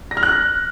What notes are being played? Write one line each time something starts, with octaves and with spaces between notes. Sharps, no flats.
A#6
F6
F#6